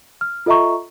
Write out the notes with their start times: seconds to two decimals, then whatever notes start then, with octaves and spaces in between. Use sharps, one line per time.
0.21 F6
0.46 F4 A4 D#5 E5 A#5 C#6